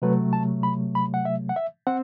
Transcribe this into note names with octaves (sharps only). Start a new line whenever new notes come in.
C3 F#3 A3 B4
A5
B5
B5
F#5
E5
F#5
E5
C4 F#5